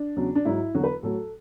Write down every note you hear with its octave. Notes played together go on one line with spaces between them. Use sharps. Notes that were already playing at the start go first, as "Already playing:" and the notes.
Already playing: D4
E2 C#3 F#3
D4
G#2 F#3 E4
E2 D3 F#3 F#4
B4
A2 F#3 A4